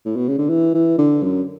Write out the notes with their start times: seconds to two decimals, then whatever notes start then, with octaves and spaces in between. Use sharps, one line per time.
0.06 A2
0.17 B2
0.28 C#3
0.38 D3
0.49 E3
0.74 E3
0.98 D3
1.23 F#2